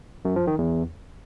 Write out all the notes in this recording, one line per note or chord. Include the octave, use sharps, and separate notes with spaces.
F#2
F3
D#3
E2